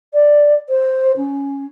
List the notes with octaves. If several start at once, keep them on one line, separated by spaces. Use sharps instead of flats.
D5
C5
C#4